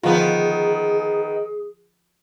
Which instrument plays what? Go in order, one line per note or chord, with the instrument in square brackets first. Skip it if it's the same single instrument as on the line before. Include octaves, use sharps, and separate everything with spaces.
[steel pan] D3 F3 F4 [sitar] D#3 B3 [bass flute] G#4